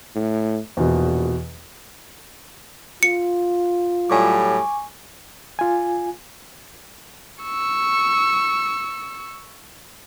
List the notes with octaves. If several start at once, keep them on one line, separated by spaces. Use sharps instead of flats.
A2
A#1 E2 B2
F4 C#7
A2 F#3 G3 G#5 C#6 D6
F4 G#5
C#6 E6